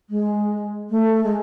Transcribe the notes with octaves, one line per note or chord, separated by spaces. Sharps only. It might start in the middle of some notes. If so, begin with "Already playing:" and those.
G#3
A3
G#3